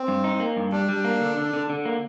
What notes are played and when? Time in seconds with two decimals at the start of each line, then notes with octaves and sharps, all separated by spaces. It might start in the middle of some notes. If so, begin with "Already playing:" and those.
Already playing: C4
0.08 G2
0.24 D#4
0.40 A#3
0.57 G2
0.72 G3 D4
0.89 G3
1.04 A#3
1.21 D3
1.37 D3
1.53 D3
1.70 D3
1.85 A#3